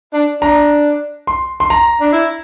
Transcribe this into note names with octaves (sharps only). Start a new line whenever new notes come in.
D4
D4 A#5
C6
C6
A#5
D4
E4